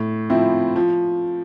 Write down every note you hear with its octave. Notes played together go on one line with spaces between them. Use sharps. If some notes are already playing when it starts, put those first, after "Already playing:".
Already playing: A2
F3 C4 E4
F3